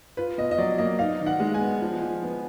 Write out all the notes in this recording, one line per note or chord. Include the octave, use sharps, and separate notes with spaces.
F4 B4
B2 D#5
D#5
F#3 D5
A#3 D#5
D#4 F5
D#3
F#5
G#3
G#5
B3
F3
F3
B3